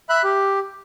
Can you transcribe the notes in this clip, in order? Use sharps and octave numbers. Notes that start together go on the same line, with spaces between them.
E5 B5 F#6
G4